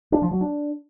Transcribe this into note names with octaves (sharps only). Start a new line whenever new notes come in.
D4
F3
F#3
D4